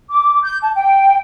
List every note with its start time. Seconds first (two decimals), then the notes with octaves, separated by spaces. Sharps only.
0.10 D6
0.43 G6
0.62 A5
0.75 G5